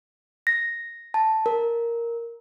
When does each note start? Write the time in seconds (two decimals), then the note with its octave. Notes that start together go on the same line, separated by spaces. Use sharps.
0.47 A#6
1.14 A5
1.46 A#4